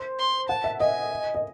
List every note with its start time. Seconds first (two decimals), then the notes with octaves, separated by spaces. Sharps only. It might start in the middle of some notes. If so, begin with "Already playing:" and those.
Already playing: C5
0.19 C6
0.49 F#5 A5
0.64 E5
0.80 D#5 G#5
1.35 D#5